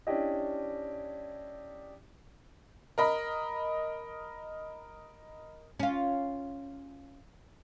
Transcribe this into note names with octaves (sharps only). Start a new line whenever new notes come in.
C#4 D4 E4 G4 D#5
A#4 D#5 B5
C#4 F4